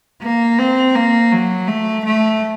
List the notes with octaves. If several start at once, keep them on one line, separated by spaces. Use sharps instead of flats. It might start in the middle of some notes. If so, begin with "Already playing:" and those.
A#3
C4
A#3
F#3
A3
A3